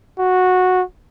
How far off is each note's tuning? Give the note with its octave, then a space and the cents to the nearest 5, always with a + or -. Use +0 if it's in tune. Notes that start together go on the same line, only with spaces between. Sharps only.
F#4 -10